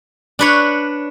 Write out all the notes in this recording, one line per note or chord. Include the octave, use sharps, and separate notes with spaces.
D4 B4 C#5